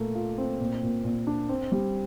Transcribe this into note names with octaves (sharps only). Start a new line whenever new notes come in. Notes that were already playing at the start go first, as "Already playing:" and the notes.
Already playing: A#2 A3 A#3
F4
C4
A#2
A#2
A#2
D4
C4
G3